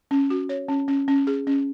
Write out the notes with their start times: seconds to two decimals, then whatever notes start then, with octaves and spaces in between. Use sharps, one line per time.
0.11 C#4
0.30 F#4
0.49 C#5
0.68 C#4
0.88 C#4
1.08 C#4
1.27 G#4
1.47 C#4